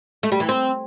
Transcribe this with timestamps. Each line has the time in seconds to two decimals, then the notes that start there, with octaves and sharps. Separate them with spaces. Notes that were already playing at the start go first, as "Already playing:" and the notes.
0.23 A3
0.32 G3
0.40 E3
0.49 C4